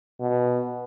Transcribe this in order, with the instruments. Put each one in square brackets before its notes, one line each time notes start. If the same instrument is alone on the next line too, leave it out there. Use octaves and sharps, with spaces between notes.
[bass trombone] B2